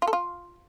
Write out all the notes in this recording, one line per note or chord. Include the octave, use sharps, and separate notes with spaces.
F4
A4
F4